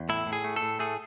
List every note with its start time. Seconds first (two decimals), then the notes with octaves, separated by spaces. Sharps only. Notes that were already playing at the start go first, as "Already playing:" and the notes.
Already playing: E2
0.09 A2 E4
0.27 A2
0.33 G#4
0.44 A3
0.56 A4
0.62 A2
0.79 A3 G#4